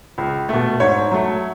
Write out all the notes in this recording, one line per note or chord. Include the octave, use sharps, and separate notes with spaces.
C#2
B2 A3
G#2 C#5
F#3 A3